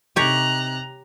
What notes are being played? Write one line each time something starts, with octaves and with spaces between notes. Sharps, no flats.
C3 D#4 G4 C#5 A#5 F#6